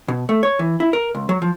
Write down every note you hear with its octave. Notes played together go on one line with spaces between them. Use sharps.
B2
A3
C#5
E3
E4
A#4
C#2
F#3
F3